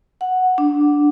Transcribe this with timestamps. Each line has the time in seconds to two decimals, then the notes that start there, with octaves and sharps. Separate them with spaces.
0.21 F#5
0.58 D4